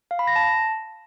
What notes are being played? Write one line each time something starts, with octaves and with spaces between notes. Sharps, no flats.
F5
B5
A#6
A5